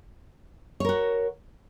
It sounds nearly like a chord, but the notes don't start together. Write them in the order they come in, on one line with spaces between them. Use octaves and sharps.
C#5 A#4 F#4